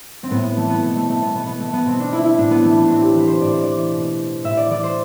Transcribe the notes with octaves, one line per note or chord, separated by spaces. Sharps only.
C4
A2 B3
B3
E3 A3
B3
B2 A3
A3
A3
B3
B2 B3
B3
A3
B3
B2 C4
D4
E4
E4
A2 D4
B3
E3 A3
B3
D4
A2 C4
G4
E3 B4
C5
A2 D5
C5
D5
E3
B2
A2 E5
D5
E3 D5
C5